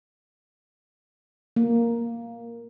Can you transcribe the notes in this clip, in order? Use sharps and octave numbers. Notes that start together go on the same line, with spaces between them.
A#3